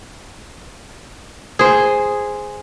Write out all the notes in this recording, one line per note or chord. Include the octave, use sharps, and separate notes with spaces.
G#4 C5